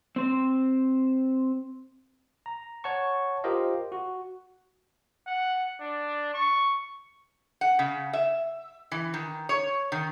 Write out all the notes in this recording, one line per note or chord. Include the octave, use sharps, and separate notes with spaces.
C4 C5
A#5
C#5 F#5 A5 C#6
F4 G4 A#4 C5 D#5 F5
F#4
F#5
D4
C#6
F#5
C#3
E5
E3
D#3
C#5
D#3